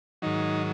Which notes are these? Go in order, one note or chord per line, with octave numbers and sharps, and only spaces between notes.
G#2 D#3 F#3 D#4